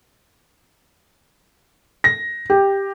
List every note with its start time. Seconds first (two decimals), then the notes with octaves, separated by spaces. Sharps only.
2.04 A#6
2.50 G4